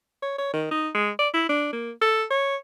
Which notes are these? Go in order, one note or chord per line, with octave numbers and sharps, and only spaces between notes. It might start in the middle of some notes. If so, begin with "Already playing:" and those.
C#5
C#5
D#3
D#4
G#3
D5
E4
D4
A#3
A4
C#5